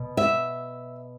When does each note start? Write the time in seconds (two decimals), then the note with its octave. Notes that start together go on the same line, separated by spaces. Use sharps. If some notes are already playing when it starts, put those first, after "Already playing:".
Already playing: B2
0.17 E5